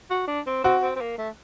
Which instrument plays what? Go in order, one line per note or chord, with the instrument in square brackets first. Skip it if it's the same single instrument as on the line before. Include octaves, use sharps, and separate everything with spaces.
[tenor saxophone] F#4
D4
C4
[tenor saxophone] C4 [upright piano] F#4
[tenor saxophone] C4
C4
A#3
A3